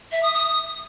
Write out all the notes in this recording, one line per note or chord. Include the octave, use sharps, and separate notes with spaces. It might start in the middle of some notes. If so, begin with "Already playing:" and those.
E5
D#6
D#6